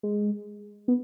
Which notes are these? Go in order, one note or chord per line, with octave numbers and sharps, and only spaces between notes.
G#3
B3